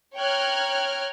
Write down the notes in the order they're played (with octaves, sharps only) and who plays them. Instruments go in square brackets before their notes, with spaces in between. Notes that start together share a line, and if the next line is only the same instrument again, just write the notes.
[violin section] C#5 G5 A#5 F6 F#6 G#6